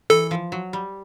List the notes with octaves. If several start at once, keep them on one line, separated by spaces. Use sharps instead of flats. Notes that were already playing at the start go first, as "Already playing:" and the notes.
E3 A4
F3
F#3
G3